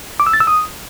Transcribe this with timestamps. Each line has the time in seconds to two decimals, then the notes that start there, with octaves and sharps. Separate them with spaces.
0.20 D6
0.27 E6
0.33 A6
0.40 E6
0.47 D#6